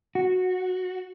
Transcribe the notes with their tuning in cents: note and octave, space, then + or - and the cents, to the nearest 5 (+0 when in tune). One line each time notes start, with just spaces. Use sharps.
F#4 -10